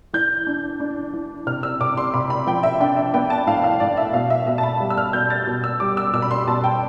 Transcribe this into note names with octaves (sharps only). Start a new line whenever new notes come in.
E3 G6
D4
D4
E3
C3 F6
E6
C3 D6
C6
C3 B5
B5
F3 G5
E5
D4 G5
E5
B3 G5
A5
A2 F5
F5
A2 D5
E5
B2 F5
E5
B2 E5
A5
B5
G3
E6
F6
B2 G6
A6
B2
E6
G3 D6
E6
B2 E6
B5
C6
B2 A5
G5